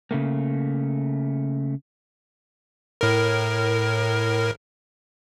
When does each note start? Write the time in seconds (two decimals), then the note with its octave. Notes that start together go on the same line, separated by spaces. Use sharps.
0.11 C#3 A3 A#3
3.01 A2 A#4